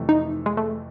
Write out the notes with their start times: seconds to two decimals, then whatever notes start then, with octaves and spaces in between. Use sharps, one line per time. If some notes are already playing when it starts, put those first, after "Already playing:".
Already playing: F2 C3 E3 A3
0.09 D#4
0.46 G#3
0.57 A3